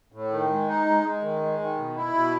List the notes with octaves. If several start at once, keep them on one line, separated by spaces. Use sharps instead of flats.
A2
D#3
G#3
D#4
G#3
G#3
D#3
G#3
D#3
B2
E4
B2